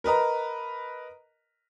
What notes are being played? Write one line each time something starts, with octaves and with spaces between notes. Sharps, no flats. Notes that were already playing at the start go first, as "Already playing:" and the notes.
A#4 B4 D#5 A#5